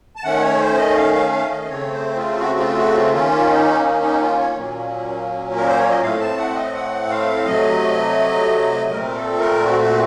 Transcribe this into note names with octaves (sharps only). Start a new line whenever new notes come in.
A5
D#3 A3 C#4 F#5
C#5
C5
D#5
F5
F5
F5
D#5
C#3 A3 C4 C#5
C5
F4
F#4
F4
F#4
F4
D#3 A#3 C#4 F4
D#4
D#4
D#4
F4
C#5
A#2 F#3 A#3 C#4
A#4
C5
C#5
D#5
A2 A3 C4 F5
A5
F#5
D#5
F#5
F5
C3 F#3 A3 D#5
A#2 A3 C4 A#4
A4
A#4
F#4
F#4